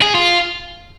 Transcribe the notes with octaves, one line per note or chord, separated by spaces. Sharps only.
G#4
F4